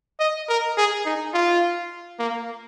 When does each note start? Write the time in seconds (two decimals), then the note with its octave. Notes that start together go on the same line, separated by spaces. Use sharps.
0.20 D#5
0.49 A#4
0.77 G#4
1.06 D#4
1.34 F4
2.19 A#3